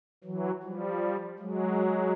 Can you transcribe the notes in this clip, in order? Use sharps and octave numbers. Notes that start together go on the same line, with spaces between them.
E3 F#3
F3 G3
F#3 G#3